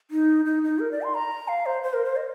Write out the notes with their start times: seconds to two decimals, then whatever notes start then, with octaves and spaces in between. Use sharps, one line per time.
0.11 D#4
0.45 D#4
0.63 D#4
0.79 A#4
0.92 D5
1.02 C6
1.15 A#5
1.48 F5
1.66 C5
1.83 C5
1.93 A#4
2.05 C5
2.16 D#5